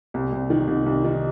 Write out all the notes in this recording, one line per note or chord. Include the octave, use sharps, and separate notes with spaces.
C2
C2
D#3
C2
C2
D#3